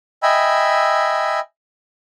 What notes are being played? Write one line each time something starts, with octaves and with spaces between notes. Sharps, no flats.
D#5 E5 G5 G#5 B5 E6